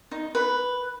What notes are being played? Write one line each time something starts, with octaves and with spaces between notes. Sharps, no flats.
D#4
B4